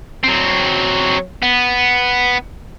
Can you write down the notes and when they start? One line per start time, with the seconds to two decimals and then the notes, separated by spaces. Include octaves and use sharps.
0.24 F#3 C4
1.43 B3